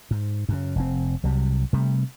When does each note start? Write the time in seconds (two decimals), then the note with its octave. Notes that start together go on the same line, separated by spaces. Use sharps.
0.11 G#2
0.49 F#2 C#3
0.76 F1 C4
1.23 C2 C3 F#3 G3
1.73 C3 G3 A3